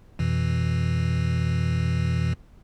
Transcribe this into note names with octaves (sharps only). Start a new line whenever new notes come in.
F2 B2 E3